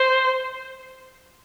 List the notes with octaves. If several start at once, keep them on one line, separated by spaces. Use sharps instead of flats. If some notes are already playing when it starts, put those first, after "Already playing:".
Already playing: C5